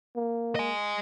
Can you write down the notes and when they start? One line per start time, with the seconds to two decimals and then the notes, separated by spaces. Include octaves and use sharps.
0.16 A#3
0.56 D#5 G#5